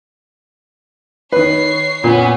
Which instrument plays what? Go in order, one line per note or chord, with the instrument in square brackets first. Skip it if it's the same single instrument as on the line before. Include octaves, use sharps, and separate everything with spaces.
[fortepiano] D#3 B4 [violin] C#5 C7
[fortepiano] A#2 [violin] B3 C#4